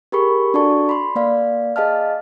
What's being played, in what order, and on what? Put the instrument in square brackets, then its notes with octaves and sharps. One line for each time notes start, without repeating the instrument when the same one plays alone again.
[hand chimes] G4 G#4 A#4 B5 C#6
D4 F#4 A4 D5 A5 C#6
B5 C6
A#3 D5 F5
G#4 D#5 F5 A5 F6